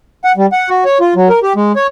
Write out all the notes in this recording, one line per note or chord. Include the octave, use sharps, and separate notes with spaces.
F#5
G3
F#5
F#4
C#5
F4
F#3
A#4
G4
G#3
C#5